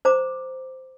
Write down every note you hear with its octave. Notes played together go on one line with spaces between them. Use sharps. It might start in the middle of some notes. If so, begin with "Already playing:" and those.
C5 A#5 D6